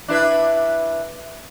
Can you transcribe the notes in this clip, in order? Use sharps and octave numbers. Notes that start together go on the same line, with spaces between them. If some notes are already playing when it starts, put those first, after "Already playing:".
D4 E4 B4